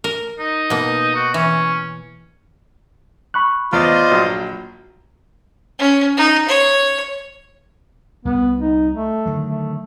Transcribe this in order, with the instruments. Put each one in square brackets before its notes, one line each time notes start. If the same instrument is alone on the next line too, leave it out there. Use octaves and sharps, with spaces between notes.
[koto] A#4
[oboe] D#4
[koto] B2 A#3
[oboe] F#4
[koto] E3 [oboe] C#4
[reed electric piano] B5 C#6 F#6
[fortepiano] E2 [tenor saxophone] F4 [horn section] C5 D5 D#5
[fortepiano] A#1 F#3
[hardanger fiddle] C#4
D#4
C#5
[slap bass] C2 [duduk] B3
[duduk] D#4
A3
[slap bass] D3 D#3 F#3
[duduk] A3